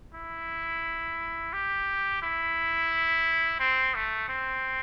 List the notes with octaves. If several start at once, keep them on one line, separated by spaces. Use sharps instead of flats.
E4
G4
E4
C4
A3
C4